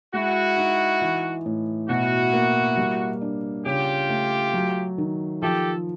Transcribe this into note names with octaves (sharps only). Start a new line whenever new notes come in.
G#3 E4 F#4
D#4
E3
A2
B2 E4 F#4
A#3
G3
D4
C#3 F4 G4
A3
F#3
D#3
F3 G4 A4